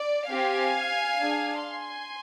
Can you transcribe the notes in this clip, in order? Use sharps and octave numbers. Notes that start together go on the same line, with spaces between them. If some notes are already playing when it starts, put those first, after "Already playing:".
Already playing: D5
C4 G4 F5 G#5
D4 G#4
G#5 C6